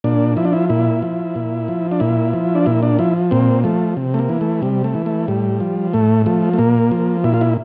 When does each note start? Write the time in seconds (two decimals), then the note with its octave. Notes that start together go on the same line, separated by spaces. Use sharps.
0.04 A#2 D4
0.37 F3 E4
0.45 D4
0.53 E4
0.69 A#2 E4
1.02 F3
1.36 A#2
1.68 F3
1.91 D4
2.00 A#2 E4
2.33 F3
2.55 D4
2.66 A#2 E4
2.83 D4
2.99 F3 E4
3.31 A#2 C4
3.64 F3 A3
3.97 C3
4.14 A3
4.19 A#3
4.29 E3
4.41 A3
4.62 C3 G3
4.84 A3
4.95 E3
5.06 A3
5.28 A2 G3
5.60 F3
5.93 A2 A3
6.26 F3 A3
6.54 A3
6.58 A#2 A#3
6.91 F3
7.24 A#2 E4
7.34 F4
7.41 E4